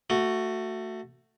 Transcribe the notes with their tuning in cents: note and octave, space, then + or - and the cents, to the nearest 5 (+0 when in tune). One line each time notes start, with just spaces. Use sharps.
A3 +15 F#4 +0